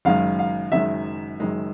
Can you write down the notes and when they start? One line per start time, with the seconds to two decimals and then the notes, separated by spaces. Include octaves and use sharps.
0.05 F#1 F#2 D#3 G#3 F5
0.39 F5
0.72 F#1 F#2 D#3 G#3 E5
1.40 F#1 F#2 D#3 G#3